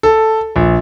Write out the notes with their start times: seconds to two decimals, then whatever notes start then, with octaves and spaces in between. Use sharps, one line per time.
0.03 A4
0.56 A#1